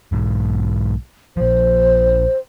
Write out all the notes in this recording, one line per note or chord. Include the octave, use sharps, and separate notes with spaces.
B1 G#2
A#1 F3 C5